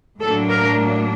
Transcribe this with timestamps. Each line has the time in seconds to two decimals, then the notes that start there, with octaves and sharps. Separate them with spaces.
0.20 A2 F#3 A#3 D4 A4
0.50 A#4